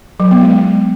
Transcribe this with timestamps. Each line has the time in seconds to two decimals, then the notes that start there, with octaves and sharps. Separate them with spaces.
0.20 F#3
0.31 B3
0.43 G#3